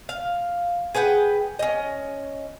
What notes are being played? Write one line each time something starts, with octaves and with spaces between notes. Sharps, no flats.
F5
G#4 B4 F#5 G5
C#4 D#5